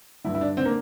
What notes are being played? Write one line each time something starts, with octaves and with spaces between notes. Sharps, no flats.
G2 D3 E4
E4
D4
D3 C4
A#3